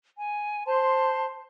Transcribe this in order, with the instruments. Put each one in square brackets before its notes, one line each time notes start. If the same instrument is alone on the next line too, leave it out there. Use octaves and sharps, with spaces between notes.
[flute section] G#5
C5 A5 C6